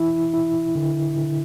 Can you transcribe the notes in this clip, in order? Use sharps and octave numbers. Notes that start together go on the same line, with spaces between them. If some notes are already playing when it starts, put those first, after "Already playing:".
Already playing: E3 E4
E4
D3
D3